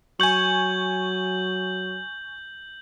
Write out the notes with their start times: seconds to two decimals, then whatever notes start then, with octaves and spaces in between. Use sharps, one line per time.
0.20 F#3 G#5 C#6 G6 F#7